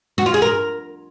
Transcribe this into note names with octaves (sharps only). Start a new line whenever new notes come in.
F#4
F4
G#4
A#4